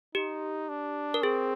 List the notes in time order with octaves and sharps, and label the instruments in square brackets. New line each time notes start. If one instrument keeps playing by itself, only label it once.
[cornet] D#4 [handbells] G4
[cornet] D4
[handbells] A#4
[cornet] C4 [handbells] G#4